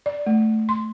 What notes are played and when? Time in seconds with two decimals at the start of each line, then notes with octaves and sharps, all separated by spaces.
0.06 D5
0.26 A3
0.69 C6